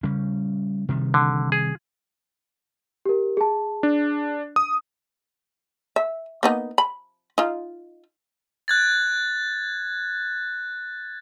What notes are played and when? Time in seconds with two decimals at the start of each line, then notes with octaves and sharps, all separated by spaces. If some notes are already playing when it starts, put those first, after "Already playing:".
0.03 C#3 G3 C#4
0.89 C3 D#3 G3
1.14 D3
1.52 G#4
3.05 G4 A#4
3.37 G#4 A5
3.83 D4
4.56 D#6
5.96 E5
6.43 A#3 B3 D#4
6.78 B5
7.38 D#4 F4
8.68 F#6 G#6 A6